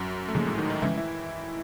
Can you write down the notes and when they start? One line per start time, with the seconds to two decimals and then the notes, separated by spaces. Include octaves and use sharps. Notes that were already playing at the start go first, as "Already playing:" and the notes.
Already playing: F#2 F#3
0.29 A3
0.35 G#2 C#3 F3 G#3 A#3
0.47 A2 A3
0.58 D#3 D#4
0.70 D#3 D#4
0.82 C#3 E3 F3 G#3 C#4 E4
0.98 E3 E4